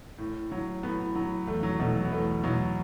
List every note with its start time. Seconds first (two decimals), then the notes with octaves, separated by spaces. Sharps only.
0.18 A2
0.52 F#3
0.83 A2 B3
1.15 F#3
1.47 E2 A3
1.63 F#3
1.79 B2 F#3 A3
1.95 F#3
2.05 B3
2.12 E2 A3
2.44 B2 F#3